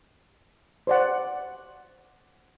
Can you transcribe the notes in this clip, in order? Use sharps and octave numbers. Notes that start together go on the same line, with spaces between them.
C5 D5 F#5